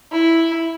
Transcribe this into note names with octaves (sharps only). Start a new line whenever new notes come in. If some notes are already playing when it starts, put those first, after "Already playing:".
E4